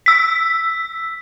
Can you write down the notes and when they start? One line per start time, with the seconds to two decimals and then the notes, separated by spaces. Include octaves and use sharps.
0.06 E6 B6